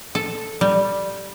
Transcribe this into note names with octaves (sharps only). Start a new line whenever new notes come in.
A4
G3